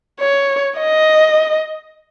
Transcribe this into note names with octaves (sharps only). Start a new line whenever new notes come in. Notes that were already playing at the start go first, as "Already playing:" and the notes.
C#5
D#5